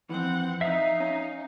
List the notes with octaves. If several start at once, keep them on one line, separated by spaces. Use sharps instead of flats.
F2 E3 C4 F#5
D#4 E5 F5
C#4